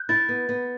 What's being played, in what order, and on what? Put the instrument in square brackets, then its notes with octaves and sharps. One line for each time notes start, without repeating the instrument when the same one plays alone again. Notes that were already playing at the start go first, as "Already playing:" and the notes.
Already playing: [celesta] F#6 G6
[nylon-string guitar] E4 [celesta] A6
[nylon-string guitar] B3
B3